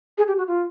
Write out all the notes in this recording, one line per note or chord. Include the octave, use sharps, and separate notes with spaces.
G#4
G4
F#4
F4